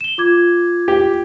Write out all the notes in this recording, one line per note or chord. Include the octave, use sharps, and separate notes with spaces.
E7 G7
F4 D6 G#6
G4